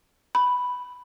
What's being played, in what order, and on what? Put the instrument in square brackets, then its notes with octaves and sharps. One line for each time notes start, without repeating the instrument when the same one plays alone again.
[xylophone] B5